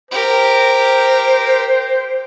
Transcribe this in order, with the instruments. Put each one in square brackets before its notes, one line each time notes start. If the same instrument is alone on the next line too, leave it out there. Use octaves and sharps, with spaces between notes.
[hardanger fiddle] G4 A#4 [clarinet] C5